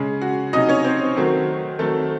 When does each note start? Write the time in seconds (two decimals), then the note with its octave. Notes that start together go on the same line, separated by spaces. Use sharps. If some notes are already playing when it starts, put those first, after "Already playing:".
Already playing: C#3 G#3 C#4
0.22 F#4
0.53 C3 F#3 C#4 D#4 D#5
0.69 C#4 C#5
0.84 C4 C5
1.16 D#3 F#3 A3 C4
1.79 D#3 F#3 A3 C4 A4